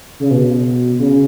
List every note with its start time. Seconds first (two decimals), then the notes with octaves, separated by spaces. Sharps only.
0.20 C#3
0.31 B2
0.99 C#3